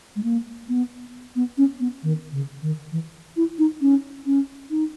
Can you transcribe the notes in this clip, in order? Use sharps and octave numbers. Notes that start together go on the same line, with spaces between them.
G#3
A#3
B3
B3
C#4
B3
D#3
C#3
D#3
E3
E4
D#4
C#4
C#4
D#4